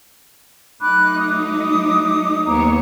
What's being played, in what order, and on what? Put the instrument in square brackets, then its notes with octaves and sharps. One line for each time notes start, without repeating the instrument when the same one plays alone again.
[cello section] F#3 A3 D#4 [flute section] B5 D6 F#6
[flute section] D6 D#6
[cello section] D#2 B3 C#5 [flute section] A#5 D6